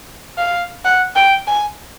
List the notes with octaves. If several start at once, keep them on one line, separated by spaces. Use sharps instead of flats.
F5
F#5
G5
G#5